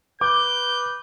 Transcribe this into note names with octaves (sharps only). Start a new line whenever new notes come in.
B4 D6 G6